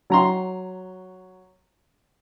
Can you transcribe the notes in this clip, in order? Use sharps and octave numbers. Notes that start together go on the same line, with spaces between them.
F#3 A#5 C6